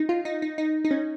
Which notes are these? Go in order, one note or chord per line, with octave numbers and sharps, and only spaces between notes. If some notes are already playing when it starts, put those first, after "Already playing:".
Already playing: D#4
F4
D#4
D#4
D#4
D#4
C#4